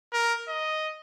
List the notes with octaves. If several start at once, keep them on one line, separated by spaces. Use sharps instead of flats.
A#4
D#5